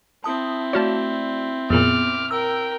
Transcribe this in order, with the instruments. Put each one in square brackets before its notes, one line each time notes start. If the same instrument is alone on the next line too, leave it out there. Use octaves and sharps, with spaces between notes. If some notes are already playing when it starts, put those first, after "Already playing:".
[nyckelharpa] C4 E4 [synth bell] A5 D#6
[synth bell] A3 F#4 D5 [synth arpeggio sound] C#5 F5 A5
[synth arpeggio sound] F2 A#2 [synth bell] B3 G#4 [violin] D6 F6
[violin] A#4 G5 [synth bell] E6